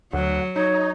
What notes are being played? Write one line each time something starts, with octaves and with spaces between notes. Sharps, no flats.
D2 F#3 F#5
D#4 C#5